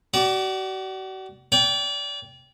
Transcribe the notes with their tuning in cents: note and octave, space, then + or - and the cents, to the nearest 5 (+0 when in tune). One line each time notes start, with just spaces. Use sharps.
F#4 +40 D5 +0
D5 -35 G5 +0